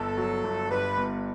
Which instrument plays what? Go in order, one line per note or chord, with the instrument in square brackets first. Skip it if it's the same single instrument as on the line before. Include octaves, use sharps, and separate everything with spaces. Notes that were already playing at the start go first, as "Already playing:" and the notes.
Already playing: [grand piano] G1 [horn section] A4
[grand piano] F#3
G1
[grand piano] G2 [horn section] B4
[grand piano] G1